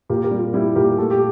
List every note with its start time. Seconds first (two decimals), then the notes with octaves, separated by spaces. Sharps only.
0.09 A#2 G4 A#4
0.24 G4 A#4
0.31 G3
0.39 F4
0.54 G3 E4 G4
0.76 A#2 G4 A#4
0.98 A3 A4
1.11 G4